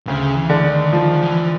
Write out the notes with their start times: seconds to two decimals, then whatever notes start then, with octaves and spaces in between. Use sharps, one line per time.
0.07 D2 C#3
0.36 E3
0.50 D3
0.65 D#3
0.93 D#3 F3
1.22 E3